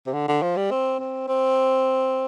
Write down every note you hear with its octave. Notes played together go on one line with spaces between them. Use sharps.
C3
D3
D3
F3
G3
C4
C4
C4